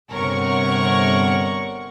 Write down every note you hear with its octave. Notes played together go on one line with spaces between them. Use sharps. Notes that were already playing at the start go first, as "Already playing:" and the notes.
G1 C3 A#4 C#5 F#5 C#6